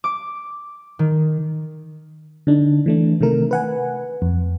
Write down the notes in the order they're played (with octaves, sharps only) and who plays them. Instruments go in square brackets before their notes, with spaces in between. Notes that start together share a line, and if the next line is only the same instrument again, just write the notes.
[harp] D6
D#3
[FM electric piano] D3 D4 D#4
E3 A3 D4
C3 D#3 A3 A#4
B4 F#5 G#5
F2